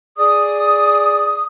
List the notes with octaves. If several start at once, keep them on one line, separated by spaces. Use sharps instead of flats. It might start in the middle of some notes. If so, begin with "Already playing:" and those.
G#4 D5 D#6